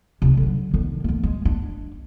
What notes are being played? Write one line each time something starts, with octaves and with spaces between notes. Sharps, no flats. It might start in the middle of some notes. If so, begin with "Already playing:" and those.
C3 D4
D3 F#3
D3 D#3
F3 A3
G#3
D4